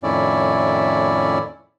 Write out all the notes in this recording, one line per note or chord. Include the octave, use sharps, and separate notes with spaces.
F2 A2 D#3 C#4 E4 D5